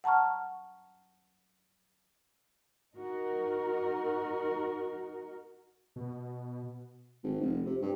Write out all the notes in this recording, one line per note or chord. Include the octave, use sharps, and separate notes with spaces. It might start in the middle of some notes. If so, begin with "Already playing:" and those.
F#5 A5 A#5 C#6 F6
D#4 F#4 A#4
B2
G#1
F1
C3
G2